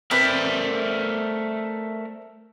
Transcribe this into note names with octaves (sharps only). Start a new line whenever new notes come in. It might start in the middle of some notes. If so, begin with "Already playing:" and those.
A3 C4 A#4 B4 D5 E5